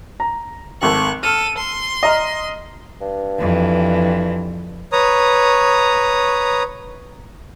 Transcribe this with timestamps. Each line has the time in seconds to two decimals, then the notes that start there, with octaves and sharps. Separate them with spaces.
0.20 A#5
0.82 G#1 A4 C#6 F#6
1.23 A4 F6 D#7
1.58 C6
2.03 D#5 A#5 F6
3.01 G2
3.39 F2 E3
4.92 B4 C#5 A#5 D#6